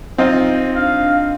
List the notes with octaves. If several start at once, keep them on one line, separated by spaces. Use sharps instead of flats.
C4 D#4 F4 C5
D4 F5